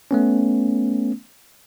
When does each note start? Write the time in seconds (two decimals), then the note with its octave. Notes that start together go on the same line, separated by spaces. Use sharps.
0.11 A3 B3 C#4